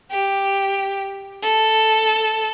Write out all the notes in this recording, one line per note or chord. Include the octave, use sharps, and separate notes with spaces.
G4
A4